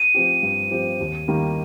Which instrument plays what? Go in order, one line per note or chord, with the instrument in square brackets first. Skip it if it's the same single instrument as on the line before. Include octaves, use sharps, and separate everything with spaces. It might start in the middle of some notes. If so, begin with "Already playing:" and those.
Already playing: [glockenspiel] D#7
[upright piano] F3 C4 G4
G2
F3 C4 G4
D#2
D#3 G3 A#3